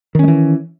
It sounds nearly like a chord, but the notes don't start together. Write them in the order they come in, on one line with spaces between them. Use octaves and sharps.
D#3 C#4 G#3 E3